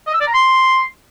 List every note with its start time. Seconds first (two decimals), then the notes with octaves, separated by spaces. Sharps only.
0.07 D#5
0.14 E6
0.21 D5
0.27 A#5
0.34 C6